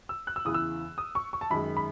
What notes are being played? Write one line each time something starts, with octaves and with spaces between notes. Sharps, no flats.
E6
F#6
E6
E2 C#3 E3 D#6
E6
D#6
C#6
C#6
A5
F#2 D#3 G#3 B5
B5